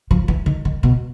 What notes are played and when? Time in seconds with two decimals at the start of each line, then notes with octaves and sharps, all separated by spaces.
0.11 F3
0.28 E3
0.46 D#3
0.65 D#3
0.83 B2